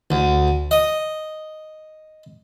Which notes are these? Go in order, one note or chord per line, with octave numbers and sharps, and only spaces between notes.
D2
D#5